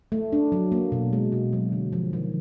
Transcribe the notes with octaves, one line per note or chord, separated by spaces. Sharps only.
A3
D4
F#3
A#3
B2
G#3
B2
F#3
D3
F3
D#3